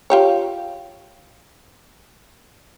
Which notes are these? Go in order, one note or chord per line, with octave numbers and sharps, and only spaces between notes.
F4 G4 C#5